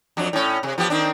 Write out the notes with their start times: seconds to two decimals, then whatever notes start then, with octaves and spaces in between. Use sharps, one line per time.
0.17 F2 F#3 D4
0.33 A2 C#4
0.63 C3
0.78 F3 B3 G4
0.90 D#3 C4 D4